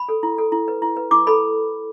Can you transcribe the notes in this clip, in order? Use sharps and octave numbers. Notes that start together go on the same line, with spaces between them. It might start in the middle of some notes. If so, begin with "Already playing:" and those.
Already playing: B5
A4
E4
A4
E4
B4
E4
B4
E4 D6
A4 B5